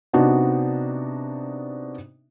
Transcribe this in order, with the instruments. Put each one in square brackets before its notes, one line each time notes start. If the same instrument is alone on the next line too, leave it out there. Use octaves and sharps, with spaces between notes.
[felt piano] C3 B3 D4 D#4 F#4